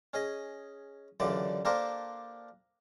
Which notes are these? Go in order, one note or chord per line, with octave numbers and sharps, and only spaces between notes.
C#4 G#4 D#5
C#2 F#2 D3 E3 D5
A#3 D4 G4 A4 A#4 C5